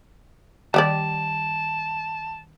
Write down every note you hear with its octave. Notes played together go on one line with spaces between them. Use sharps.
D#3 G3 G4 D5 A5